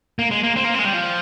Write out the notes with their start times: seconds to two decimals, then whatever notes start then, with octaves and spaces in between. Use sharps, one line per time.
0.19 A#3
0.31 G#3
0.44 A#3
0.57 C4
0.65 A#3
0.75 C4
0.80 G#3
0.85 G3
0.94 F3